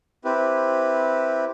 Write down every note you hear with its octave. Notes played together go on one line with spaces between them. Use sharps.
C4 E4 G4 B4